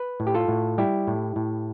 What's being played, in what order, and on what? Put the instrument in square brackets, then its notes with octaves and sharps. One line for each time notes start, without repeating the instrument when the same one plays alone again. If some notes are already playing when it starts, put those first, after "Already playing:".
Already playing: [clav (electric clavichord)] B4
A2
G4
F4 A4
A2
G3 E4 G4
A2
A2